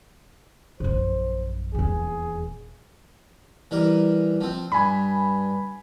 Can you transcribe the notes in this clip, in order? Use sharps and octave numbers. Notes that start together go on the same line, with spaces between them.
A#1 F#2 C5
D#1 E2 G#4
E3 G3 A#4
F3 C4
G2 G#5 B5